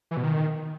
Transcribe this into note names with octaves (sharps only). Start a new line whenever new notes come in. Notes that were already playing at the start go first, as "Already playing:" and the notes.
E3
B2
D#3